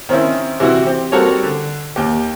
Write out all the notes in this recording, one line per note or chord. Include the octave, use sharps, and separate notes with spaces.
D#3 C4 C#4 E4
C3 E3 E4 F#4
C4 G4
G3 C4 F#4 A4 A#4 C#5
D3
D#2 G4